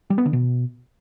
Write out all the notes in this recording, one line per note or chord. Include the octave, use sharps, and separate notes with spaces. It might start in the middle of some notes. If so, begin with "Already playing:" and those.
G3
B3
D3
B2